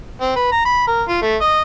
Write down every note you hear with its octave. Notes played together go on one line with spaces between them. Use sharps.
C4
B4
A#5
B5
A#4
F4
A3
D#5